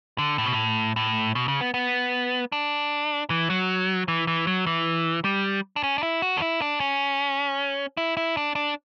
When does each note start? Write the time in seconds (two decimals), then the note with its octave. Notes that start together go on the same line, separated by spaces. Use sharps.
0.18 D3
0.38 A2
0.46 B2
0.53 A2
0.96 A2
1.35 B2
1.48 C#3
1.61 B3
1.74 B3
2.52 D4
3.30 E3
3.50 F#3
4.08 E3
4.27 E3
4.47 F#3
4.66 E3
5.24 G3
5.76 D4
5.83 C#4
5.98 D4
6.03 E4
6.22 F#4
6.37 D4
6.42 E4
6.61 D4
6.80 C#4
7.97 E4
8.17 E4
8.37 D4
8.55 D4